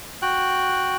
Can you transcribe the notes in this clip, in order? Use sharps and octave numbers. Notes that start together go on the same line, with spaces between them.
F#4 G5 F#6